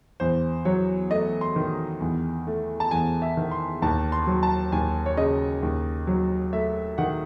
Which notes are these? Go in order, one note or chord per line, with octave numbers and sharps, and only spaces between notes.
E2 C5
F#3 C#5
A3 D#5
C6
D#3
E2
A3
A5
E2 G#5
E5
D#3
C6
D#2 A5
C6
F#3
A5
D#2 G#5
C#5
C#3 D#5
D#2
F#3
A3 E5
D#3 F#5